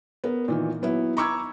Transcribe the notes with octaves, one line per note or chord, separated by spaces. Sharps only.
B3 A#4
A#2 D#3 E3
F#3 B3 E4
A#5 B5 C#6 D6 E6 G#6